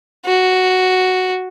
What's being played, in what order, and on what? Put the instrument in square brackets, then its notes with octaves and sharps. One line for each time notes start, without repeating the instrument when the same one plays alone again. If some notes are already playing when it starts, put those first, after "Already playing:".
[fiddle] F#4